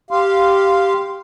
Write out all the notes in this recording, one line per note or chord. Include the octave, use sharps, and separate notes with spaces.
G4 F5 C6